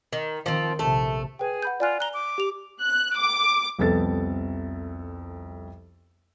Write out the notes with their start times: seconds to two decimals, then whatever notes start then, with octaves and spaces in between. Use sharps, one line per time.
0.13 D#3
0.46 D#3 F3 C4
0.79 A#1 C3 A3
1.39 G#4 B4 G5
1.62 F#5 B5 G6
1.80 F4 D5 G#5 F#6
2.00 A#5 F#6 G7
2.14 D6
2.38 G4 F7
2.82 F#6
3.16 D6
3.79 C2 F2 B3 A4 A6